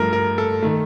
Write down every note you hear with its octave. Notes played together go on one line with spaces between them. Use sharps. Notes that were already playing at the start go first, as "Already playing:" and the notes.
Already playing: G2 F3 A3 A#4
A#4
A4
D#3 A3